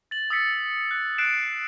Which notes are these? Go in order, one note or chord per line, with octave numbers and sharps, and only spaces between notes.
A6 F#7
D#6 E6 A6 B6 C#7
F#6
F#6 C7 D7 E7